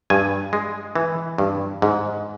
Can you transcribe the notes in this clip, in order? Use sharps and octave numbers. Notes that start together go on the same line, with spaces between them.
G2 G#5
G#3
E3
G2
G#2